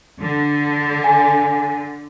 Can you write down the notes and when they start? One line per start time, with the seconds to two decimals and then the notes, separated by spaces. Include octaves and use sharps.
0.21 D3
1.04 G#5